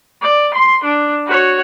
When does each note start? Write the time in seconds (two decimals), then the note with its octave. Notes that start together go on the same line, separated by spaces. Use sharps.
0.21 D5
0.54 C6
0.84 D4
1.27 F#4 C#5